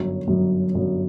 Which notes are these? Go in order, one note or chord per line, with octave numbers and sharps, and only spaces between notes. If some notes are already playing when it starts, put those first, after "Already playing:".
Already playing: G1 F#2 F#3
G1 F#2 F#3
G1 F#2 F#3